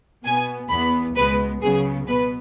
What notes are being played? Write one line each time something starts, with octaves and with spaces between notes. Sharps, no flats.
B2 B3 G#5
E2 E3 B3 B5
C#2 B2 G#3 B3 B4
C#2 C#3 F#3 B3 G#4
B2 B3 B4